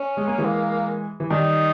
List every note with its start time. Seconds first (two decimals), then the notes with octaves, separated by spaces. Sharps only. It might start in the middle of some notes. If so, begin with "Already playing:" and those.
Already playing: C#4
0.17 G#3
0.27 A#3
0.38 E3 G#3
0.45 A#3
1.20 E3
1.30 D#3 G3 D#4